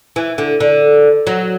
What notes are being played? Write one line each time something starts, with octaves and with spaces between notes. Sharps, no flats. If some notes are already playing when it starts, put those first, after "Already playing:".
E3
D3
D3
F#3